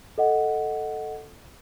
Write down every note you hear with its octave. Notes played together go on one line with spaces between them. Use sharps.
A4 D#5 F#5